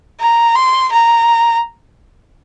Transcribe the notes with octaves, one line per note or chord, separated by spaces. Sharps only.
A#5
C6
A#5